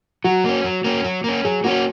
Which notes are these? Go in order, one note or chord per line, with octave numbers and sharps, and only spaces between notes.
F#3 F#4
A#3 C#4
F#3
A#3 C#4
F#3
A#3 C#4
F#3 G#4
A#3 C#4 F#4